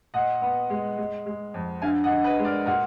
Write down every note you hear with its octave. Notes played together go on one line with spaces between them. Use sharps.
A#2 D#5 F#5
B3
G#3
G#3
G#3
F2
D3 F5 G#5
D#5 F#5
D3
B4 D#5
G#3
A#4 D5
A#2 F#4 A#4